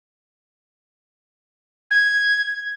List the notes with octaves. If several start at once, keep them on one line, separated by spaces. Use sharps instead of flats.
G#6